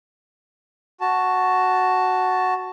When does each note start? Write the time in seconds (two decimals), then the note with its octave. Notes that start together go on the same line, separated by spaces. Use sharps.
1.01 F#4 A5